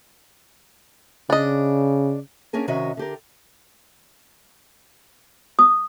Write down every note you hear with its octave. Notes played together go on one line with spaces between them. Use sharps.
C#3 D4 D#5
A#3 C#4 D4 G#4 A#4
C3 D#3 C#4 F#4 D#5 E5
D3 G4 A#4
D#6